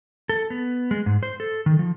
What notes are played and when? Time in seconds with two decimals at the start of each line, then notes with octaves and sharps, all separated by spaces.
0.29 A4
0.50 B3
0.91 G#3
1.06 G#2
1.23 C5
1.40 A4
1.66 D#3
1.79 F3